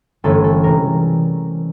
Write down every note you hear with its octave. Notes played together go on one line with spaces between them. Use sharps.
G1 G2 E3 A3 C#4 A4
A4
C3 E3 G#3 A#4